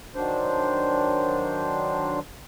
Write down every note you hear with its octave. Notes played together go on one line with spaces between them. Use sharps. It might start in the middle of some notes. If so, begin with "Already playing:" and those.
D#3 F#3 D4 C5